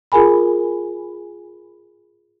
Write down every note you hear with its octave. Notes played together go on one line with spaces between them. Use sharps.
F4 G#4 A#4 G#5 B5